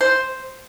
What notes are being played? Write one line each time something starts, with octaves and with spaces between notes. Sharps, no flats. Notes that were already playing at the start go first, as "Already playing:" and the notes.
C5